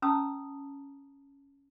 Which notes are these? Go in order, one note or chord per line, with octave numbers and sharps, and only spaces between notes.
C#4 A5 A#5 D#6 E6